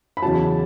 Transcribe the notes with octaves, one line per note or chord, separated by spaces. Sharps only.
B5
E2 C#3 F#3 A5